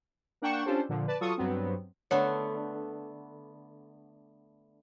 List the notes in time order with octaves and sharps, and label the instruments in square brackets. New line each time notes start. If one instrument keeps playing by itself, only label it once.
[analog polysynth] A#3 D4 F#5 G5 C#6 E7
C#4 D4 F4 G4 A4 C5
A#2 D3 F3
B4 D5 A5
F#3 F4 A4 C#6 D#6
G2 F#3 B3 C4
[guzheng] D3 A3 B3 [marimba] C#5 F#5